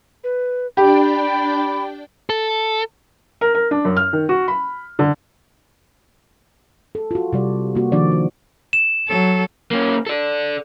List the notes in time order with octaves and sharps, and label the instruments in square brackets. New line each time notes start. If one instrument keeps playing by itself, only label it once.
[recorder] B4
[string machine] D4 D5 G5 [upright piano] G4 [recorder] B5
[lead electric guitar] A4
[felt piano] A#4
A#4
D4
F#2
F6
D#3
F#4
B5
D3
[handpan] A4
F4 F#4
C3 G3 D5
A#3 F#4
D#3 F3 D4 D5
F#4
[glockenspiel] E7
[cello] F#3 A4
[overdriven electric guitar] A#3 C#4
A4 D5